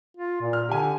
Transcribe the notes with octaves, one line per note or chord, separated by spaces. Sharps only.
F4
A#2
F6
D3 G4 G#5